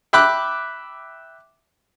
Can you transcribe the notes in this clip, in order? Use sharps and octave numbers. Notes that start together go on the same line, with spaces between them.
E5 G5 B5 D6 F#6